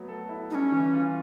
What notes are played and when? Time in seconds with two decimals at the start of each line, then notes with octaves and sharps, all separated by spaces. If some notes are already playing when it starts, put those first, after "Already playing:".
Already playing: F#3 A3 B3
0.08 A4
0.29 E4
0.50 G3 D#4
0.55 C#4
0.72 E3
0.93 F4